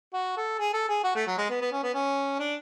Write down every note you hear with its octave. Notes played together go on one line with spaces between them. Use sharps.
F#4
A4
G#4
A4
G#4
F#4
A3
F#3
G#3
B3
B3
C#4
B3
C#4
D4